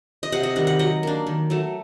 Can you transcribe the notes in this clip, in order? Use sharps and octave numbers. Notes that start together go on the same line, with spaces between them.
D#5
C3 F#5
D#5
D#3 G3 F#5
F#5
F#3 D#5
A#3 D4
D#3
F#3 A3